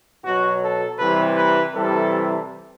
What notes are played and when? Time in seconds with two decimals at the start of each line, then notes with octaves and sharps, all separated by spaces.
0.24 B2 F#3 F#4
0.62 A4
0.99 C3 E3 G3 B4
1.36 B4
1.74 C3 E3 G3 A4